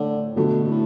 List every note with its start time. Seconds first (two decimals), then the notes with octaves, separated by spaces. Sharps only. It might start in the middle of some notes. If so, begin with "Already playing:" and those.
Already playing: A2 D3
0.36 B2 D3 A3 F#4
0.64 B2
0.71 A2